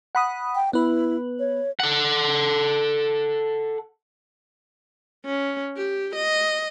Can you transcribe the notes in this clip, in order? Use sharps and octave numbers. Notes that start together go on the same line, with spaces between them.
F#5 B5 D#6
G5
B3 E4 B4
C#5
A4 F#5
C#4
G4
D#5